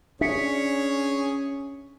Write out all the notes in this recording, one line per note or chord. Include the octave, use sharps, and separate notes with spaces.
C#4 D4 G#4 C#5 E5 B6 C#7